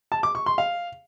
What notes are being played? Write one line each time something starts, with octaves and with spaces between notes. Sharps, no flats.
A5
D6
C#6
C6
F5